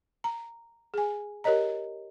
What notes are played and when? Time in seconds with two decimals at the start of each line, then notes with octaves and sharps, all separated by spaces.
0.24 A#5
0.94 G#4 G#5
1.44 G4 A#4 C#5 D#5 A#5